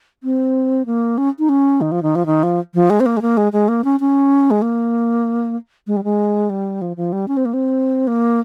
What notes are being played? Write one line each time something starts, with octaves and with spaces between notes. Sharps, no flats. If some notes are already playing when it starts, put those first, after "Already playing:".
C4
A#3
C#4
D#4
C#4
D#3
F3
D#3
F3
D#3
F3
F3
G#3
C4
A#3
G#3
A#3
G#3
G#3
A#3
C#4
C#4
G#3
A#3
G#3
G3
G#3
G3
F3
F3
G3
C#4
C4
A#3
C4
A#3